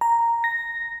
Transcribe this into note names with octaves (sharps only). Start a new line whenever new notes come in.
A#5
A#6